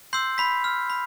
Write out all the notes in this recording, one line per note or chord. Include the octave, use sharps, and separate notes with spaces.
C6 E6 G6 C7
B5 B6
F6
B5